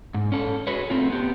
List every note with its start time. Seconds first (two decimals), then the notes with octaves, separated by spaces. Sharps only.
0.14 G#2
0.32 C#4 A4
0.67 F#4 G#4 B4 C#5
0.90 A3 C4 F4
1.10 B3 G4